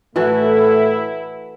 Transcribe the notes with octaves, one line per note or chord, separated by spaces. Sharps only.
A2 E3 A3 E4 F#4 A4